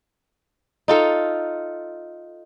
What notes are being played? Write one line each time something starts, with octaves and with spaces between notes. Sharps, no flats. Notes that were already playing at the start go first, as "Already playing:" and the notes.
D#4 F4 A4